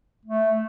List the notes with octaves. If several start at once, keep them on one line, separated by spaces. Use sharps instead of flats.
A3